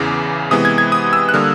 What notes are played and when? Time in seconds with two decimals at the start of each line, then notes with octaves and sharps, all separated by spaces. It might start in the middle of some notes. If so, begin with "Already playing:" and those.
Already playing: E2 C#3 E3 D6
0.51 C3 E3 G#3 B3 D#6
0.65 G#6
0.78 G#6
0.92 D#6
1.13 E6
1.29 F#6
1.34 D3 G3 A#3 F6